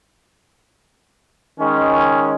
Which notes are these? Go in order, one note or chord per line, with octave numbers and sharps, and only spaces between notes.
D#3 G#3 C#4